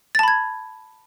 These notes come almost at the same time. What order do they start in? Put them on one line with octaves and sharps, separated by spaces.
A6 A5 B5 G#6